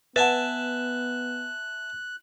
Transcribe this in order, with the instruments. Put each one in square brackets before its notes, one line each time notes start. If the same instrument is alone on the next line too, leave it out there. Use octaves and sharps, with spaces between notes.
[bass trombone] B3 [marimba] B4 F#5 [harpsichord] E5 G#5 A5 [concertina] F#6